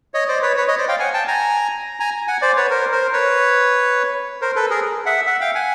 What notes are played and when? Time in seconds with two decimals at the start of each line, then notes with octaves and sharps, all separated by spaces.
0.14 C#5 D#5
0.28 C5 D5
0.42 B4 C#5
0.57 B4 C#5
0.68 C#5 D#5
0.78 C5 D5
0.88 F5 G5
1.00 F#5 G#5
1.14 G5 A5
1.28 G#5 A#5
2.00 G#5 A#5
2.27 F#5 G#5
2.41 C5 D5
2.56 B4 C#5
2.70 A#4 C5
2.92 A#4 C5
3.13 B4 C#5
4.41 A#4 C5
4.56 A4 B4
4.70 G#4 A#4
5.06 E5 F#5
5.26 E5 F#5
5.41 F5 G5
5.55 F#5 G#5